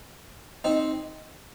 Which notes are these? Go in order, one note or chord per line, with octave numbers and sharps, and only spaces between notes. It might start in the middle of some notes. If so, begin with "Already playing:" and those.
C4 D#4